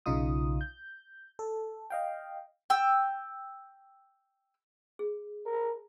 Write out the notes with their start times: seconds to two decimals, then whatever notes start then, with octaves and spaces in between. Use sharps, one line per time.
0.06 B1 C#3 D#4 F4 D#6
0.61 G6
1.39 A4
1.90 D#5 F5 G5
2.70 G5 E6
4.99 G#4
5.46 A#4